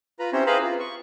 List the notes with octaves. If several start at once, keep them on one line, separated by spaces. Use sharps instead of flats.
F4 B4 A#5
C4 C#4 E4 G4 C5 C#5
G#4 B4 C5 F5 A#5 B5
F4
C#6